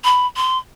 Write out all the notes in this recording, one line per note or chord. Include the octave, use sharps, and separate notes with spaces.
B5
C6